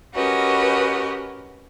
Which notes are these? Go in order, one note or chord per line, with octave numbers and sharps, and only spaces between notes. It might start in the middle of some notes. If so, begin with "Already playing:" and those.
C#4 F#4 G4 A#4 B4 D#5